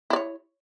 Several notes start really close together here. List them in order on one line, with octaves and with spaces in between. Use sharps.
E4 D5 C#5